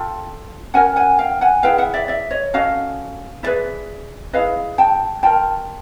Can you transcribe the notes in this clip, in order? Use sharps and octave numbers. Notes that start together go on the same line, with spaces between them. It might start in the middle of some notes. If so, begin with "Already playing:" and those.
Already playing: F4 A4 G5 A5
C#4 F#4 A#4 F#5 G#5
F#5 G#5
F5 G5
F#5 G#5
E4 G#4 B4 F5 G5
E5 F#5
D5 E5
D5 E5
C#5 D#5
C#4 F#4 A4 D#5 F5
E4 G#4 B4 D5 E5
E4 G#4 B4 D#5 F5
G5 A5
F4 A#4 G5 A5